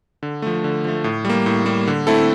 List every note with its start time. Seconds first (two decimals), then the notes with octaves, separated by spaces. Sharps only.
0.23 D3
0.42 F3 A3
0.64 D3
0.85 F3 A3
1.04 A2
1.25 G3 A#3
1.46 A2
1.66 G3 A#3
1.87 D3
2.07 A3 C4 E4 A4